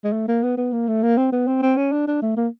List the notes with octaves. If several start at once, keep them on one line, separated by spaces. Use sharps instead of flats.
G#3
A3
A#3
B3
B3
A#3
A3
A#3
C4
B3
C4
C4
C#4
D4
D4
A3
A#3